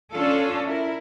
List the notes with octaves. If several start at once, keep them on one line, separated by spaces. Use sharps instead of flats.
C#4 D4 F4 A4
E4 A#4